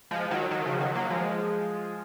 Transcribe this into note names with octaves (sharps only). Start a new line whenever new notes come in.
F3 G#3
D#3 F#3
D#3 F#3
C#3 F3
D#3 F#3
F#3 A#3
F3 G#3